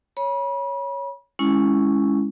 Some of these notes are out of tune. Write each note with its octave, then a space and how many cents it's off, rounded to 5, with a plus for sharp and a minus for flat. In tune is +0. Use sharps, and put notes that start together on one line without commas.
C#5 +0 B5 -35
G#3 +0 C#4 +0 E4 +0